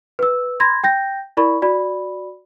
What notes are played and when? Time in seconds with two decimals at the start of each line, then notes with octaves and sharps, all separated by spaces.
0.19 B4 E6
0.60 B5 C6 G#6 A#6
0.83 G5 G6 A#6
1.37 E4 A#4 D5 B5 C#6
1.62 F#4 D5 B5